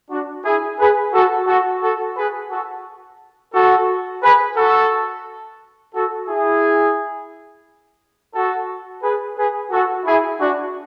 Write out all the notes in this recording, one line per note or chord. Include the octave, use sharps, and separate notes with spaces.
D4 F#4
E4 G#4
G#4 B4
F#4 A4
F#4 A4
F#4 A4
G#4 B4
F#4 A4
F#4 A4
G#4 B4
F#4 A4
F#4 A4
E4 G#4
F#4 A4
G#4 B4
G#4 B4
F#4 A4
E4 G#4
D4 F#4